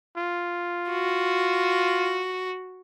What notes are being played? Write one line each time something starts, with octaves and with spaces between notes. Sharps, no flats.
F4
F#4